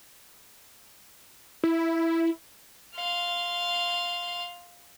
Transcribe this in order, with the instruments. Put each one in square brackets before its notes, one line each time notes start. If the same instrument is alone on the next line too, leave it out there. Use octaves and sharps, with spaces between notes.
[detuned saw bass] E4
[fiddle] F5 C6